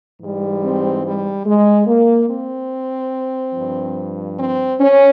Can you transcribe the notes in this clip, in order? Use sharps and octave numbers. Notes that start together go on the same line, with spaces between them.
G#2 E3 G3
C4
G3
G#3
A#3
C4
G2 F3
C4
C#4